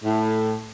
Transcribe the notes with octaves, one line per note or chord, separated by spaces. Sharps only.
A2